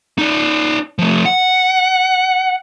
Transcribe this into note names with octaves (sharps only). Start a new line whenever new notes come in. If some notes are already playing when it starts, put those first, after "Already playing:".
D#4 D5
F3 A3
F#5